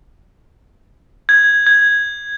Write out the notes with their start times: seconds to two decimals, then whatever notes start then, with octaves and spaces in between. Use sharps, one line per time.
1.29 G#6
1.67 G#6